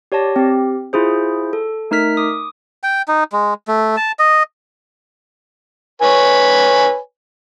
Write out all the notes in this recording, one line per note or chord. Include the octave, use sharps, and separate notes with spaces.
G4 C#5 D5 A5 A#6
C4 G4
E4 F4 G#4 C5
A4
A3 D#4 A#4 F6 B6
D6 D#6
G5
D#4
G#3
A3
A5
D#5
B4 C#5 G#5